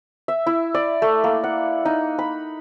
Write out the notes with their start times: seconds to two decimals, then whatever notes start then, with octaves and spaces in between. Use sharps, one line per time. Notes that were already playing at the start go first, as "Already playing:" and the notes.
0.28 E5
0.47 E4
0.75 D5
1.02 A3
1.24 A#3
1.44 F#5
1.85 D#4
2.19 B5